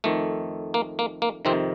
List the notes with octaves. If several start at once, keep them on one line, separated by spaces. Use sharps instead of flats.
F2 D#3 A3
A#3
A#3
A#3
F2 C3 D#3 C4